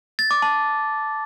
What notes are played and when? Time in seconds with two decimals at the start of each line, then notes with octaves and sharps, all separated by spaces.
0.19 A6
0.31 D6
0.42 A5